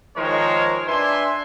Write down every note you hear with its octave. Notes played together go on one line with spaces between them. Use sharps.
D#3 F3 G#3 A#4 C5 C#5
D4 B4 E5 G#5 C6